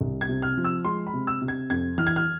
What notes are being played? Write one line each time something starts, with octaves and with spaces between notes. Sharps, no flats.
C2
G#6
C3
F6
F3
E6
G#3 C6
B5
C3
E6
C3
G#6
F2 G#6
E3 F6
G#6
F6